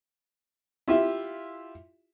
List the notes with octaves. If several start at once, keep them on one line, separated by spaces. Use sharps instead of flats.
E4 F4 G4 E5